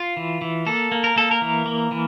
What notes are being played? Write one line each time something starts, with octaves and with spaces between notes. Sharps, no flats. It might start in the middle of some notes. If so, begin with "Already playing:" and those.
Already playing: F4
E3
E3
A#3 A4
A#3
A#4
A#3 A4
A#4
E3
A#3
E3